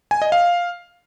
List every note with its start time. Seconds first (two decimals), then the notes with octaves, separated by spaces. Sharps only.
0.11 G#5
0.22 D#5
0.32 F5